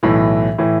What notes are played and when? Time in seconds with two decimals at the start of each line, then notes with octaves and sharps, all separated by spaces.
0.03 B1 A2 E3
0.58 A2 E3